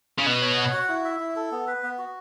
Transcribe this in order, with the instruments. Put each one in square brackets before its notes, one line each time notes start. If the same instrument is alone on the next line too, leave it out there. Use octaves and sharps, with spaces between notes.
[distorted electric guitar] C#3
[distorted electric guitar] B2 [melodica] B3
[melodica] C#5
F#5
F#4
E4
E5
E4
A4
B3
B4
B3
F#4